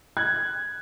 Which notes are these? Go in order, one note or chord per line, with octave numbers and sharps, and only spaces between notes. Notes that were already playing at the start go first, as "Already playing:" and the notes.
F#6 G#6